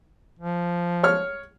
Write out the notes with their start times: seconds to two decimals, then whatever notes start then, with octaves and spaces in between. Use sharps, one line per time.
0.39 F3
1.03 C#5 F6